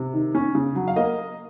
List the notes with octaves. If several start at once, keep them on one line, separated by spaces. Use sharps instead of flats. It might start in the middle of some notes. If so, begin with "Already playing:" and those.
Already playing: C3
D#3
C#4
C#3
F#3
F5
A#3 D#5